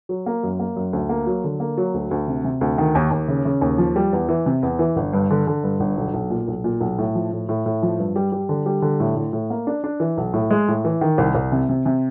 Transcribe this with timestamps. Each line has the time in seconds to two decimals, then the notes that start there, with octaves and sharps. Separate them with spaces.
0.09 F#3
0.26 A#3
0.43 F#2
0.60 A#3
0.76 F#2
0.93 D2
1.09 A#3
1.27 F#3
1.44 D3
1.60 A#3
1.78 F#3
1.94 D2
2.11 D2
2.27 C3
2.44 C3
2.61 D2
2.78 D#3
2.95 D#2
3.11 D#2
3.28 C#3
3.45 C#3
3.61 D#2
3.78 F3
3.96 G3
4.13 E2
4.29 E3
4.46 C3
4.63 E2
4.79 E3
4.96 G1
5.13 G2
5.30 D3
5.47 D3
5.64 G2
5.80 G1
5.97 B1
6.14 B1
6.30 A#2
6.48 B1
6.64 A#2
6.81 B1
6.98 A2
7.15 F3
7.32 A2
7.49 A2
7.66 A2
7.83 F3
7.99 G2
8.16 G3
8.32 G3
8.49 D3
8.66 G3
8.82 D3
9.00 A2
9.16 A2
9.33 A2
9.50 A#3
9.67 D4
9.84 D4
10.00 E3
10.17 B1
10.34 A2
10.50 G#3
10.68 A2
10.85 E3
11.01 D#3
11.18 C2
11.35 C2
11.52 C3
11.69 C3
11.86 C3